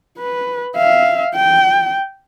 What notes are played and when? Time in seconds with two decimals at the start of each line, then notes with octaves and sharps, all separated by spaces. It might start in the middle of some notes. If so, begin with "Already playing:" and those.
0.18 B4
0.76 E5 F5
1.35 G5